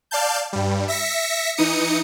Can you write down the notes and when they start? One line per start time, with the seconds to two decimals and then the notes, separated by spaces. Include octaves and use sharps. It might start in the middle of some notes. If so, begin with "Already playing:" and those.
0.11 D5 F5 A5 G6
0.53 G2 G3
0.88 E5 A#6 B6 C#7
1.57 E3 D#4 D#6 C#7